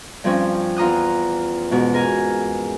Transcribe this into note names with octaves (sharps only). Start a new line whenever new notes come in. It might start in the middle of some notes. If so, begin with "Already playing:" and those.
G2 F3 C4 C#4
E2 F4 A#5 D#6 F#6
G#2 B2
A#4 G#5